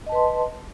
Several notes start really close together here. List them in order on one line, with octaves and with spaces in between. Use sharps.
D#5 A5 B4 C6